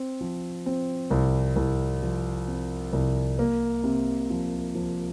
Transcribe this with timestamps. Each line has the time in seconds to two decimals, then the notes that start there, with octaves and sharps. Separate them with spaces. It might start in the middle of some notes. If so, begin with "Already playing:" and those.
Already playing: C4
0.21 F3
0.66 C4
1.11 C2
1.56 C2
2.03 F3
2.48 C4
2.93 C2
3.39 A#3
3.84 C3
4.30 F3
4.75 F3